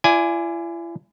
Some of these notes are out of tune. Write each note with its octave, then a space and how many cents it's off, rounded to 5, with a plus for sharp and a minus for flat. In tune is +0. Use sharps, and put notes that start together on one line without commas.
E4 +45 D5 +0 G#5 +0